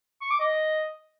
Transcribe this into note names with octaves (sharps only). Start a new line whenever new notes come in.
C#6
D6
D#5